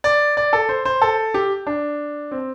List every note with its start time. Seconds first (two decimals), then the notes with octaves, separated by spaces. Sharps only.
0.04 D5
0.37 D5
0.53 A4
0.69 C5
0.85 C5
1.02 A4
1.34 G4
1.67 D4
2.31 C4